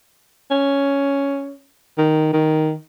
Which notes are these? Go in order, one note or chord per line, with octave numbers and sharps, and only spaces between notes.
C#4
D#3
D#3